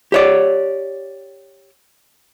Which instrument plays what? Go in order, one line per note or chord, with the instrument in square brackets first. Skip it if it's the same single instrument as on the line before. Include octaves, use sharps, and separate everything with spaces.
[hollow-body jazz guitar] G4 C#5 D5